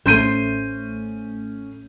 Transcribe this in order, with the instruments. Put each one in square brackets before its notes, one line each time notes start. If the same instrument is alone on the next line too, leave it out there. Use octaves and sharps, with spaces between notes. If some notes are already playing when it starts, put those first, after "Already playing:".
[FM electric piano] A1 A3 [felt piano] C#4 G6 D#7 [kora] C5